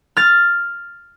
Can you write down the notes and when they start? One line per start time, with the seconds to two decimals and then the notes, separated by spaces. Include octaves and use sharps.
0.17 F6 A6